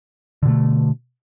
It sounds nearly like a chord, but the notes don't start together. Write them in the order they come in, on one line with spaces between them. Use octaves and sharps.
D3 B2 A3